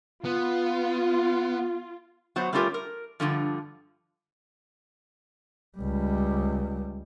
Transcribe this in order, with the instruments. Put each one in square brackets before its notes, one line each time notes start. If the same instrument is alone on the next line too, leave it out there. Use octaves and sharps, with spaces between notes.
[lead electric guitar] B3 [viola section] F4
[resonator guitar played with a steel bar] F#3 B3 C5
G3 A3 C#4 F4 G4 A#4
A#4
G2 B2 D3 F3
[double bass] C#2 G3